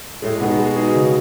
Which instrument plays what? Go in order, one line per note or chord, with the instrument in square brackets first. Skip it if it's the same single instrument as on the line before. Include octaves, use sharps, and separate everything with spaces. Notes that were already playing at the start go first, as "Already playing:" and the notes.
[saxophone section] A2 [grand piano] G#3
[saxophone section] A2
[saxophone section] B2 [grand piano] B3 D#4 G#4
[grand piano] G#3
D#4 G#4
C#3